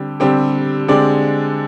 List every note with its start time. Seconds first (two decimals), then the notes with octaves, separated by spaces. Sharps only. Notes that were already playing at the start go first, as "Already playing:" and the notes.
Already playing: D3 G3 C4 G4
0.20 D3 G3 C4 G4
0.88 D3 G#3 C4 G4 D5